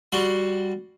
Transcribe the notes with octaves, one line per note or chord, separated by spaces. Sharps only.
G3 F#4 C6